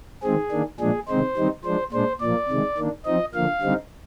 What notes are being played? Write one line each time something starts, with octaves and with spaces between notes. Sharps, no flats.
D#3 G#3 C4 G#4
D#3 A#3 D4
A#2 F3 G#3 D4 G#4
C3 D#3 G#3 C4 D#4 C5
D#3 G3 C4 D#4
F3 G#3 D4 C5
A#2 G#3 D4 C5
A#2 F3 A#3 D5
C3 D#3 G#3
D#3 A#3 D4
F3 C4 D#4 D#5
D3 F3 A#3 F5
D3 G3 C4 D#4